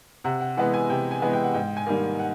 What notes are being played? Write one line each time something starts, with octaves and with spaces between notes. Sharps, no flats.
C3 F#5
F#5
E3 G#3 B3 F#5
G#5
C3 G5
G#5
E3 G#3 B3
G5
F#5
G#2 G5
G#5
D#3 G3 A#3
F#5